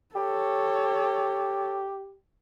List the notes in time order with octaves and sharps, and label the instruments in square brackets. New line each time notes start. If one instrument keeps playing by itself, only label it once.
[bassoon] G4 [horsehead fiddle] A4 C#5